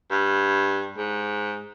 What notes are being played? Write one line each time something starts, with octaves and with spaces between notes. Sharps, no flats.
G2
G#2